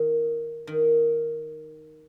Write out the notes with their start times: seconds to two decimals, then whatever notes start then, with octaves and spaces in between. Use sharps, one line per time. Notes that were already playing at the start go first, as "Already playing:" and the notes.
Already playing: D#3
0.67 D#3